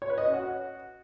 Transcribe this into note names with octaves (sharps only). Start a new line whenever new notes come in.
C#5
B4
D#5
C#4
F#4